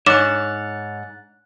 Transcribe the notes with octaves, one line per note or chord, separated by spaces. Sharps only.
G#2 C#5 D6 F#6 A6 E7